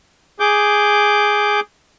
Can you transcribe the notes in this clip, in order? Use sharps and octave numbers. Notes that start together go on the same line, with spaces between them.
G#4 D6 G6